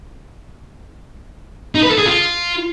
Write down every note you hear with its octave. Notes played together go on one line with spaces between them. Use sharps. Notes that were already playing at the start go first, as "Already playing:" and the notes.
D#4
B4
A4
G#4
F4